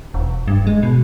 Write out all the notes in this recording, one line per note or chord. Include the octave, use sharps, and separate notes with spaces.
E1
G2
G#3
B2